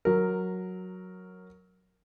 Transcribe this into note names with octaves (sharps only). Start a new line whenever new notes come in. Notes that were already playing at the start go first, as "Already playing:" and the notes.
F#3 A#4